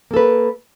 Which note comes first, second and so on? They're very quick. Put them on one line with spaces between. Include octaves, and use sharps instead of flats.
A#3 A4 B4